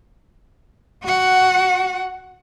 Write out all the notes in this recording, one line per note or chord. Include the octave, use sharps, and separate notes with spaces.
F#4 F#5